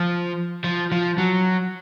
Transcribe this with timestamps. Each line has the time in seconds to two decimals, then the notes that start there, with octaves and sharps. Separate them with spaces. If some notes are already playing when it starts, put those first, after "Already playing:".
Already playing: F3
0.64 F3
0.92 F3
1.18 F#3